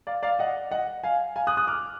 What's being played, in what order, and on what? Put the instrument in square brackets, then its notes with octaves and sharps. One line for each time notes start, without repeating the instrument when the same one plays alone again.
[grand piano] D5 F5
D5 F5
D#5 F#5
D#5 F#5
F5 G#5
F5 G#5
D#6 F#6
D#6 F#6
D6 F6